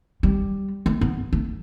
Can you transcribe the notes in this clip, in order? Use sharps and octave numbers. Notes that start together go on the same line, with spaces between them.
G3
A3
B3
A3